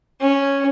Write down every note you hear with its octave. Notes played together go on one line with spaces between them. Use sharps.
C#4